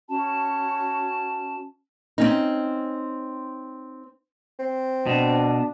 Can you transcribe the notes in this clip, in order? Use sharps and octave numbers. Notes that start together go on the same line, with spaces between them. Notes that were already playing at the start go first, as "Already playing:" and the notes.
C#4 F#4 A5
C4 C#4 D#4
C4
B2 D4